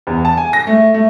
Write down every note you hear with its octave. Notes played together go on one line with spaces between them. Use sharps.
E2
A5
G#5
A#6
A3
A3